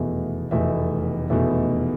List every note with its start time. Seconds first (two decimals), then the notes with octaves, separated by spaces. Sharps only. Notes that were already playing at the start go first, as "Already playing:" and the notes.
Already playing: F1 E2 B2 A3 E5
0.51 F1 E2 B2 A3 E5
1.30 F1 E2 B2 A3 E5